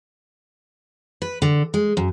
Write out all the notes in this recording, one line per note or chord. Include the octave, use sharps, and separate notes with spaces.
B4
D3
G#3
F#2